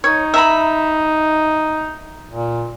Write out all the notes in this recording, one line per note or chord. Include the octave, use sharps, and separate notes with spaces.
D#4 C#5
E5 A#5 B5
A#2